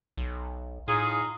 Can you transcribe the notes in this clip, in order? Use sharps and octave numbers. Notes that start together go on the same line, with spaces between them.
B1
A2 D#4 F4 G#4